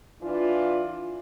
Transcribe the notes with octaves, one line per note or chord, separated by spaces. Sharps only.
E3 D4 F4